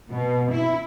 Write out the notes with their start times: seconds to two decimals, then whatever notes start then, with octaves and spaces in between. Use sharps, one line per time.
0.11 B2
0.51 E4